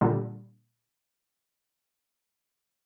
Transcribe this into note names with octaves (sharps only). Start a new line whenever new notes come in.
A#2 D3 G3